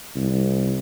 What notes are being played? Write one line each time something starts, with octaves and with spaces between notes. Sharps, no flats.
C2